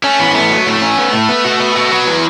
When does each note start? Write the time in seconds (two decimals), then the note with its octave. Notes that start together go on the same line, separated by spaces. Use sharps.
0.03 A3 C#4
0.19 E3 B3
0.35 A3 B3
0.50 F#3
0.66 A2 A3
0.82 C#4
0.98 B3
1.13 A2
1.29 B3
1.45 F#4
1.60 B3
1.75 F#4
1.91 F#3 B3
2.07 E3